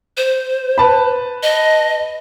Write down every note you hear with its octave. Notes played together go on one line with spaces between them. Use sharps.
C5
B4 A5 B5
D#5